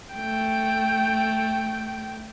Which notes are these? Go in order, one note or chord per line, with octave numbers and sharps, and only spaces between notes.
A3 G5